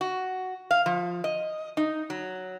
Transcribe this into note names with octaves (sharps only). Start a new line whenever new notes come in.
F#4
F5
F3
D#5
D#4
F#3